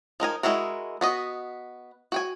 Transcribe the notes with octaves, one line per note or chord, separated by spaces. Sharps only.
F3 D#4 A#4 G#5
G#3 C#4 E4 F#4 A#4
B3 F#4 D#5
F#4 G5 G#5